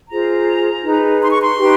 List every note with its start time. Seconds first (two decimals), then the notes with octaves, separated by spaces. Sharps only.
0.10 F4 G#4 C5 A#5
0.84 D#4 G#4 B4
1.22 C6
1.31 C#6
1.41 C6
1.60 D#4 G4 B4